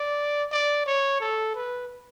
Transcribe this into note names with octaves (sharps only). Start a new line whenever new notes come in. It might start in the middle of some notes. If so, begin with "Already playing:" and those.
Already playing: D5
D5
C#5
A4
B4